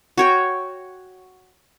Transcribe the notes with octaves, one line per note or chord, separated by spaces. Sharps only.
F#4 C#5 G5